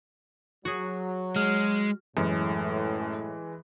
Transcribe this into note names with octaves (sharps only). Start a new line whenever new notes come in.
F#3 F#4 G#4
G#3 F6
F#2 A2 E3 G#3